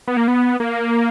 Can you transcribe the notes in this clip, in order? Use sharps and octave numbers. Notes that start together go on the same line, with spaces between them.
B3
A#3
B3
A#3